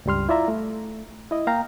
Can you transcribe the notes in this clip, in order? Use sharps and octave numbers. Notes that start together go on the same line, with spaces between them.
C#2 G2 G3 C6 F6
E4 F4 D5 E5 A#5
A3
E4 D#5
A#3 F5 G5 A#5